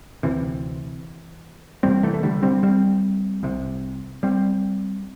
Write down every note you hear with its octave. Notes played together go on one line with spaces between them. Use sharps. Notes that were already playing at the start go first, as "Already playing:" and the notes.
D2 C3 E3
E2 C3 G3 C4
E3 A3
A3
D3 G3
G3 C4
G3 C4
C2 C3
G3 C4